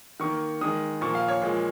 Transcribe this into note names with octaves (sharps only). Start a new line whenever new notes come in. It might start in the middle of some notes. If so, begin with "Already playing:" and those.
D#3 A#3 C#6
D#3 G#3 D#6
A#2 F3 A#3 C#6
F5
C#5
A#2 F3 G#3